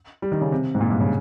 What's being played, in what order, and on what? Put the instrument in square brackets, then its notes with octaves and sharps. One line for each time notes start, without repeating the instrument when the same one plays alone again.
[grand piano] G3
D#3
C#3
C3
G#2
A#2
G2
C#3